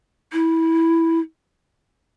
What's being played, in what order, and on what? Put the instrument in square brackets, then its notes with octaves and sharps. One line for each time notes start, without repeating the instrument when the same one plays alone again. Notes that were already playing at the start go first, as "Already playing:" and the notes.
[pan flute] E4